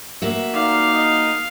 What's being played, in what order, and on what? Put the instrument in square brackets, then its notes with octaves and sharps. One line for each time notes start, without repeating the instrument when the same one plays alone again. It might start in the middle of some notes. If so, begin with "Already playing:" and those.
[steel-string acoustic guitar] A#3 F#4 E5
[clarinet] D#4 [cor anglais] D5 [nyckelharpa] F5
[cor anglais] D#5